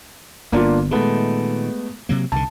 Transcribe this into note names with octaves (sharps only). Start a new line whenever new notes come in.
G1 D3 A#3 B3 D4 F4
A#2 D#3 G#3 A3 B3
C3 F#3 A#3
C2 D3 A5